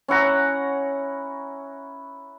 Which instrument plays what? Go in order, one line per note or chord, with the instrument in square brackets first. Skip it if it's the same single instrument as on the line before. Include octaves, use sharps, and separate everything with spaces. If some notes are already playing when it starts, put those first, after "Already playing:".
[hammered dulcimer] C#4 E4 F#5 A#5